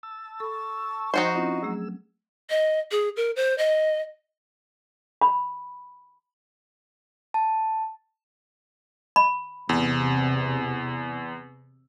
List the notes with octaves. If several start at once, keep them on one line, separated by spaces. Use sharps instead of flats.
A5 E6
A4 B5 C#6
F3 D#4 F#4 C5 D#5 G5 G#5 E6
C4 C#4 E4 F4 D#5
F#3 A3 G#4 E6
D#5
G#4
A#4
C5
D#5
B5
A5
B5
E2 C3